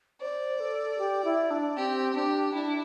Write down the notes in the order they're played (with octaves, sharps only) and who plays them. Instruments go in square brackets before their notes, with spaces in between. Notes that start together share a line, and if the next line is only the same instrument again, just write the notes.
[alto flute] C5 [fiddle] D5
[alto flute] A4
G4
E4
D4
[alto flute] C4 [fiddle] G4
[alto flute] D4 [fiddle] G4
[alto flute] D4 [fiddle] E4